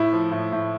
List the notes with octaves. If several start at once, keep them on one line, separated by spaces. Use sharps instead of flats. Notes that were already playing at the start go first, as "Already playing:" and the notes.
Already playing: A2 E4
F3
A2
A2